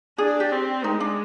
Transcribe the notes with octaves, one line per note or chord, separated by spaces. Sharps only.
D4 G#4
G4
C4
G#3 D#4
D4